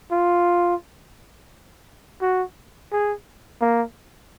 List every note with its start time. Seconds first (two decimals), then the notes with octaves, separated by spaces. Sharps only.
0.12 F4
2.21 F#4
2.92 G#4
3.61 A#3